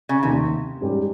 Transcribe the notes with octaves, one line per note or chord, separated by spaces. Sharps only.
C#3
F1 D#2 C3 D#3
G#2 G3 C#4 G4